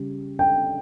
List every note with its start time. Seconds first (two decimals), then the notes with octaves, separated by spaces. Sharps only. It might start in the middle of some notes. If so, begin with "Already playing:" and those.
Already playing: C#3 G3
0.39 G5